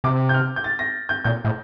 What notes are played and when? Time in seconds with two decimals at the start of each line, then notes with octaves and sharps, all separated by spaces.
0.04 C3 D6
0.29 G6
0.34 F6
0.56 G6
0.64 A6
0.79 A#6
1.09 G6
1.24 A#2 G6
1.45 A2